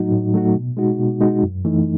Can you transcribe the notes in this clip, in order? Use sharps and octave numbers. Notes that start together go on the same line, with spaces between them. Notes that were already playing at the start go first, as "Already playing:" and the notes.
Already playing: A2 F#3 A3 D#4 F#4
A2
F#3 A3 D#4 F#4
B2
G#3 D#4 F#4
B2
G#3 D#4 F#4
F#2
E3 A3 D#4